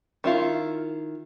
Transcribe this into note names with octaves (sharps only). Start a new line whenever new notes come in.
D#3 E4 F4